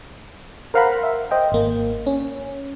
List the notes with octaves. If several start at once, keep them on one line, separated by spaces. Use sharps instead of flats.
A#4 C5 F5 F#5 A#5 B5
E5
C5 D#5 G5
G#1 A#3
C#4